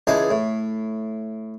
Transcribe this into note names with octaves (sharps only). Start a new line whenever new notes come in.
C#2 E3 D#4 G#4 A5
A2